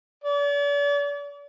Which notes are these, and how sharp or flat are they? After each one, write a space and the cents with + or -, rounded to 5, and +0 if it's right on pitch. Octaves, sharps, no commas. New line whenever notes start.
D5 -40